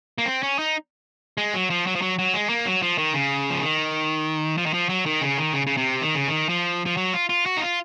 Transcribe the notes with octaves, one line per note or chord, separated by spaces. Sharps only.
A#3
C4
C#4
D#4
G#3
F#3
F3
F#3
F3
F#3
F#3
G#3
A#3
F#3
F3
D#3
C#3
F3
D#3
F3
D#3
F3
F#3
D#3
C#3
D#3
C#3
C#3
C3
D#3
C#3
D#3
F3
F3
F#3
F4
F4
F#4
D#4
F4